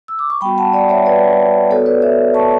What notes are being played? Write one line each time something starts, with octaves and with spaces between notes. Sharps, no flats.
E6
D6
C#6
G3 B3 F#4 G5 B5
F#5 A5
D5 F#5
C#5 E5
B4 D5
B3 F#4 A4 C#5
B4 D5
C#5 E5
A5 C#6